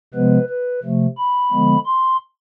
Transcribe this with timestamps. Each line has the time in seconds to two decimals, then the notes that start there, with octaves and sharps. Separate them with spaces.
0.14 C3 F3 G#3 B3 B4
0.49 B4
0.83 C3 F3 A3
1.17 B5
1.52 D3 F3 G#3 B3
1.86 C6